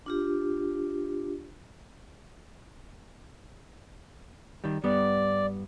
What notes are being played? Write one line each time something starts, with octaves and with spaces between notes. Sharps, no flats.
D4 F4 G4
D#3 G3
G2 G3 B3 D5